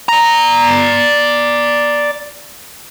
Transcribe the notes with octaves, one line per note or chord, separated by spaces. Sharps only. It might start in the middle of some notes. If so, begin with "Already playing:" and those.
D5 A#5